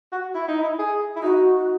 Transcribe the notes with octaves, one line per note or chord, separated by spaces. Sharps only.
F#4
E4
D#4
E4
G#4
E4
D#4 F#4